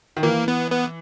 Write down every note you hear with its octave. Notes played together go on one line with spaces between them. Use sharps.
D#3
E3 A#3
B3
B3